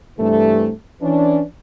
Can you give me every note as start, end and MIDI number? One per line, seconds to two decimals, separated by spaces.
0.19 0.70 43
0.19 0.70 48
0.19 0.70 52
0.19 0.70 57
1.02 1.42 52
1.02 1.42 61
1.02 1.42 62